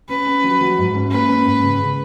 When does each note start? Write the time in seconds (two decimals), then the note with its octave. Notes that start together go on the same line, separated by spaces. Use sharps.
0.09 C#4 B4
0.26 C#4
0.44 F#3
0.61 F#3
0.78 G#2
0.94 C#4
1.11 A#3 B4
1.28 C#4
1.45 G#2
1.63 C#3
1.80 C#3